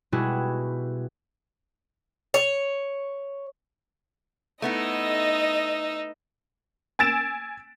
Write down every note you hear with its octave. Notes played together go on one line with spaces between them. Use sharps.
B2 G3 G#3 E4 F#4 G#4
C#5
A3 B3 D#4 E4 D#5 E6
G#5 E6 A6 D7 E7